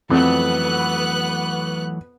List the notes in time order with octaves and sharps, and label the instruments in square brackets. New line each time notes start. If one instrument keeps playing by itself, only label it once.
[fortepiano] F2 [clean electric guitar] E3 F#3 A3 [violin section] B3 F#6